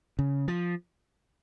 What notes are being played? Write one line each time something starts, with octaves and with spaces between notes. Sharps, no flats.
C#3
F3